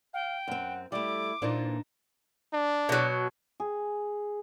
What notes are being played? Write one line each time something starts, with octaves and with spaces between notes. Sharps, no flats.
F5 G5
F#2 C4 F#5
G3 A3 E4 D6
A#2 E3 A#3 D4 D#4 C5
D4
B2 F#3
G#4